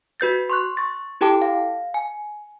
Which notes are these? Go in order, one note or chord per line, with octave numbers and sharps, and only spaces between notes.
F#4 B4 G6 A6
C6 C#6 F#6
C#6 A6
E4 G4 A4 G5 A5 D6
F5
G#5